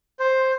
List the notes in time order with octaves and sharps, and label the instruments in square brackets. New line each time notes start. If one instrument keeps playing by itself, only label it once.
[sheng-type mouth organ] C5